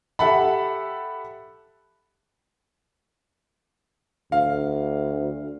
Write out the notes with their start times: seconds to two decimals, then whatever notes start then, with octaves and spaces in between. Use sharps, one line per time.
0.19 G4 A4 E5 F#5 A5 B5
4.32 D2 F5